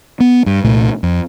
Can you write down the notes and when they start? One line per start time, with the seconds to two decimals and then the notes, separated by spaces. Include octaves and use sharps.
0.20 B3
0.46 G2
0.64 C2 A#2 A3
1.03 F2